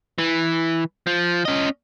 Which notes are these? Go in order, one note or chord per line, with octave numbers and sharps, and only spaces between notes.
E3
F3
C#4 D#5